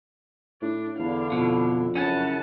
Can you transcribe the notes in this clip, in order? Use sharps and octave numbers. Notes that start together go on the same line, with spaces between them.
A2 D4
E2 D3 D4 E4 F5
F2 B2
F#2 C#3 C#4 E4 F#5 A5